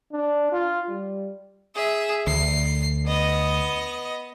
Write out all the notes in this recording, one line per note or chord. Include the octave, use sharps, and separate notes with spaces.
D4
F4
G3
G#4 E5
D2 C7
B3 D#5